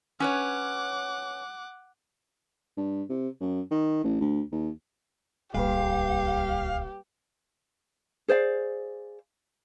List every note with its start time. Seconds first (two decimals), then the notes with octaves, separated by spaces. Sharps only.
0.20 C#4 B4 C#5 F#5 D6
2.77 G2
3.10 C3
3.41 F#2
3.71 D#3
4.04 A1
4.21 D2
4.52 D#2
5.54 D1 C2 G3 A#3 G4 B4 F5
8.28 G#4 C5 D5 F5